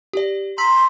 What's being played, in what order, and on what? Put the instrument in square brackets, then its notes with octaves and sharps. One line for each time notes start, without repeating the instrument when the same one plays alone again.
[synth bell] G4 D5
[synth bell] A#5 E6 B6 [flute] C6